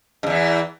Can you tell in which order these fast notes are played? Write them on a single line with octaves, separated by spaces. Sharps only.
G2 E2 E3